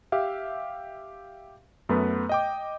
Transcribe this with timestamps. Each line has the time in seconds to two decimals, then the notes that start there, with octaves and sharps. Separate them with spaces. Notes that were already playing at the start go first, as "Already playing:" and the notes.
0.12 G4 E5 F5
1.89 F#2 A3 B3 B4
2.29 D#5 G5 D6